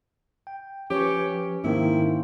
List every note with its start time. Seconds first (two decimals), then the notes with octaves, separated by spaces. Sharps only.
0.47 G5
0.90 F3 C#4 G4 B4 C#5
1.64 G#2 D#3 A#3 C4 E4